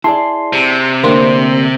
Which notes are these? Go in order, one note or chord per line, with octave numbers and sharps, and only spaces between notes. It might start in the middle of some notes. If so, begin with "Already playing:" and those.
E4 G#4 D5 A5 C6
C3
D3 A3 A#3 C4 D4 C6